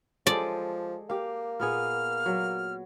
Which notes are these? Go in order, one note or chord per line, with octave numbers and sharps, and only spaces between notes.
F3 G#3 G4 A4 D5
A#3 G4 F5
A#2 B3 G#4 F6
F#3